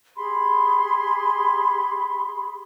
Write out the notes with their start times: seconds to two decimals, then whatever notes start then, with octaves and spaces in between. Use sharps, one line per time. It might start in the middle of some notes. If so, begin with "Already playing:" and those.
0.17 G4 G#4 B5 C6